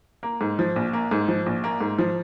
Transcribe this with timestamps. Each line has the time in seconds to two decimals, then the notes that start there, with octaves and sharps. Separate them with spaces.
0.23 A#3
0.41 G#2
0.59 F3
0.76 A#1
0.93 A#3
1.11 G#2
1.28 F3
1.46 A#1
1.64 A#3
1.81 G#2
1.99 F3